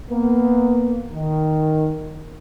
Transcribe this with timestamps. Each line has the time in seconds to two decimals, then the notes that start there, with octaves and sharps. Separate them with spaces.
0.10 A#3 B3
1.12 D#3